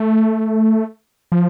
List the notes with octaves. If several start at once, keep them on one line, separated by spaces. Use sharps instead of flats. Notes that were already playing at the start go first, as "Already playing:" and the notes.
Already playing: A3
F3